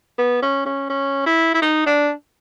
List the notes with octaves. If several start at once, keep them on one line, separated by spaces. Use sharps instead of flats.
B3
C#4
C#4
C#4
E4
E4
D#4
D4